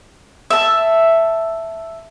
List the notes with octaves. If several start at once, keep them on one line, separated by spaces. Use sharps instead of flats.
E5 A5